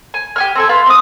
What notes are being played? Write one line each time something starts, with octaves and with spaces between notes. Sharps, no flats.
G#5
G4 G#5 F6
C4 A4 G#5
F4 B4
C4 D#6